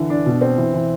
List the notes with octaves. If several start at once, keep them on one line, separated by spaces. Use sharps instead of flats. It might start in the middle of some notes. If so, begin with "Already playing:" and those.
Already playing: D3 E3
D4
B2
C4
E3
E3